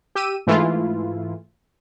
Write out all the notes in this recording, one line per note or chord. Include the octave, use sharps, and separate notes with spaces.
G4 E6 D#7
G#2 E3 A3 E4 F4